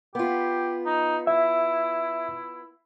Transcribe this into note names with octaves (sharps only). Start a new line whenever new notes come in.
B3 F4 G4
D#4
E4 E5